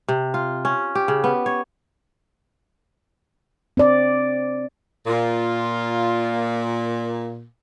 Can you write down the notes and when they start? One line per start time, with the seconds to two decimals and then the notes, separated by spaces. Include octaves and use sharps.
0.08 C3
0.34 F4
0.65 C#4
0.95 G4
1.08 C#3
1.24 B3
1.46 C#5
3.77 C4 D5
5.07 A#2 F4